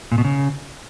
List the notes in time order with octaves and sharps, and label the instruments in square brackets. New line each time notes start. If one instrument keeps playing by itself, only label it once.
[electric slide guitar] A#2
B2
C#3